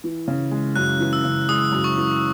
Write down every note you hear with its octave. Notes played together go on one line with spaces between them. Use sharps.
E3
C#3
G#3
F#2 F#6
E3
E6
C#3
G#3 D#6
F#2
C#6
E3